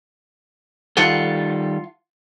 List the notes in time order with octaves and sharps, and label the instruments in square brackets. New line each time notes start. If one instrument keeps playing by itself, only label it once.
[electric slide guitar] D#3 G3 A4 [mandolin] F4 F#5 A5